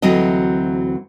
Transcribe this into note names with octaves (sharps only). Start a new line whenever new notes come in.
D2 E3 F#3 C4 D#5